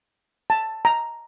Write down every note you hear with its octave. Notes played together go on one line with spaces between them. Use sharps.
A5
A#5